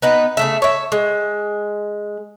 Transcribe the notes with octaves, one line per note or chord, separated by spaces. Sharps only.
B3 D#4 B4
C#3 A3 E5
C#5 E5
G#3